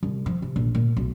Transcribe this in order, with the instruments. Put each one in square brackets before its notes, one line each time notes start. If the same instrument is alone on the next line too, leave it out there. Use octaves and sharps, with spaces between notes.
[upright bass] C2
F3
C3
A#1
A#2
B1